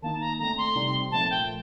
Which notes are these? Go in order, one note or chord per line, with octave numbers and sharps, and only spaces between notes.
D#3 A#3 D#4 A5
A#5
D3 A3 C4 A#5
C6
C3 G3 C4 D#4
A#2 F3 A3 A5
G5